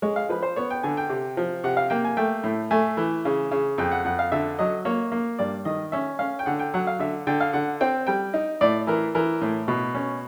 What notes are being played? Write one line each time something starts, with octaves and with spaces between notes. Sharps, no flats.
G#3 C#5
F5
F3 B4
C5
B3 C#5
G5
D3 G#5
G5
C3
F3
C3 F#5
F5
A#3 G5
G#5
A3 G5
A2
A3 G#5
E3
C#3
C#3
F2 G5
F#5
F2 F#5
F5
D3 E5
F#3 D#5
A#3 C#5
A#3
G2 D5
D#3 D#5
C#4 E5
C#4 F5
G5
D3 F#5
G5
F#3 F#5
F5
D3 E5
D3 G5
F5
D3 F#5
C4 G5
G3 G5
D#4
A2 D5
E3 A#4
E3 A#4
A2
B2
C#4